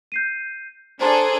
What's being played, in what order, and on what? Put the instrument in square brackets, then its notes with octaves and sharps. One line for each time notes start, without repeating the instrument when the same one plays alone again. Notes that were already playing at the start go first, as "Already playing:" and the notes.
[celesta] G6 C7 D#7
[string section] D4 G#4 A4 [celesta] C5 A#5 C6